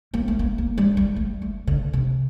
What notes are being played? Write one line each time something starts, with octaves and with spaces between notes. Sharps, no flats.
A#3
A3
A#3
A#3
G3
G3
A3
A3
D3
C3